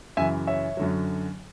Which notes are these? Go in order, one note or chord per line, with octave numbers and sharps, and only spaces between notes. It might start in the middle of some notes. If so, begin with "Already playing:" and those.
F#2 C#3 E3 E5 G#5
C#5 E5
F#2 D3 F#3